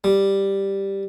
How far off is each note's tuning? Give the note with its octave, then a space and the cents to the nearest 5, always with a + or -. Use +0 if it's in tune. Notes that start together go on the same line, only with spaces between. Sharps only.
G3 +0